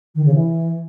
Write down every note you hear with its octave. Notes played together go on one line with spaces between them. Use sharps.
D#3
C#3
E3